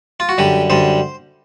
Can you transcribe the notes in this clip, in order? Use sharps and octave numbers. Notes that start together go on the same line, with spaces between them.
F4
F#4
F#2 D3 G3 G4
F#2 D3 G3 C5